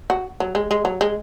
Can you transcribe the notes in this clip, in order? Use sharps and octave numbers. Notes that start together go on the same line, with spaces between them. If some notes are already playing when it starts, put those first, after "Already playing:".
F#4
F#3
G#3
G#3
F#3
G#3